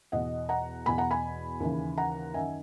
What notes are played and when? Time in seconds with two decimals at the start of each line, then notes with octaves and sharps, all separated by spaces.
0.12 E2 B2 D#5 F#5
0.49 F#5 A#5
0.86 E2 B2 G#5 B5
0.98 F#5 A#5
1.11 G#5 B5
1.60 D#2 C#3 E3
1.98 F#5 A#5
2.34 F#2 D#3 E5 G#5